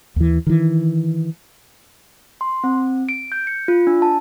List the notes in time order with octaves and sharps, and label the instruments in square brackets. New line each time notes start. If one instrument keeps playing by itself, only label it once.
[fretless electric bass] D#2 E3
D#3 E3
[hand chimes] C6
C4
D7
G6
C#7
F4
D4
A5